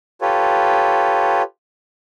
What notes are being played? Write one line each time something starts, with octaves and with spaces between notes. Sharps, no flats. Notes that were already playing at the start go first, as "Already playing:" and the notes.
F4 G4 A4 B4 C#5